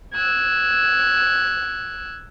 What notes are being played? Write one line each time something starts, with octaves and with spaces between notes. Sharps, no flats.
E6 F#6 G#6